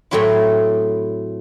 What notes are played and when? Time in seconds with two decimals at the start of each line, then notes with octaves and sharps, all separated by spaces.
0.11 A2 F#3 A3 C4 E4